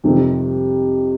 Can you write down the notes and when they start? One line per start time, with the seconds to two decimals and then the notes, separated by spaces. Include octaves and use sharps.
0.04 F2 C3 D#3 G3 C4